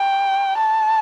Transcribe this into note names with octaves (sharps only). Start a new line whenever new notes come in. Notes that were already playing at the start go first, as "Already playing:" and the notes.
Already playing: G5
A5